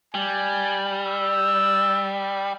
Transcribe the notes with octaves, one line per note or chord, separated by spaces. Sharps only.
G3 G#5
E6